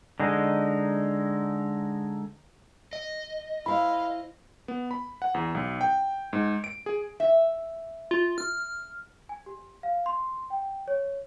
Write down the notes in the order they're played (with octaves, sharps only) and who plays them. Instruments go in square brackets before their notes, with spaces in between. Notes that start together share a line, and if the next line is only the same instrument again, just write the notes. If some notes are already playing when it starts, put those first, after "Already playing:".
[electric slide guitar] D3 G#3 D#4
D#5
[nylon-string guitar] E4 C5 [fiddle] F5 [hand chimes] B5
[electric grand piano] B3
B5
F#5
E2
B1
G5
G#2
D7
G#4
[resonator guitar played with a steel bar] E5
[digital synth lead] F4
F6
[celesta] G#5
G4
F5
C6
G5
C#5